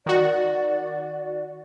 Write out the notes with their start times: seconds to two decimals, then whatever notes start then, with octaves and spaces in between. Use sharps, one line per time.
0.06 D#3 F#4 D5